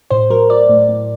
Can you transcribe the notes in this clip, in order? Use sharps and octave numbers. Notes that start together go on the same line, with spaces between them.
A2 C5
F#3 A#4
F#3 D5
A2
A2